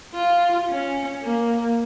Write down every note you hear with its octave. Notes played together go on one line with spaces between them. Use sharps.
F4
C#4
A#3